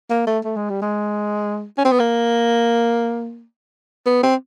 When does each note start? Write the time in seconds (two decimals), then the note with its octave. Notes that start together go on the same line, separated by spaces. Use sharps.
0.10 A#3
0.27 A3
0.45 A3
0.56 G#3
0.70 G3
0.82 G#3
1.78 C#4
1.85 C4
1.92 B3
2.00 A#3
4.06 B3
4.23 C4